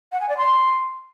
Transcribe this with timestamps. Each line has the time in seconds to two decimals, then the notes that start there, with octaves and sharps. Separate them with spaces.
0.12 F#5
0.21 G#5
0.29 D5
0.38 C6